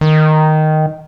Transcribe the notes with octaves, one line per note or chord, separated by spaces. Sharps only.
D#3